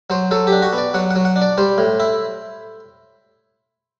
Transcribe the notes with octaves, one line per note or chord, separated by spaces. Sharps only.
F#3 C5
F#3 A4
G4
D4
F#4
B3
D5
F#3 F#5
F#5
F#3
F#5
D4
D5
G3 C5
A2
E4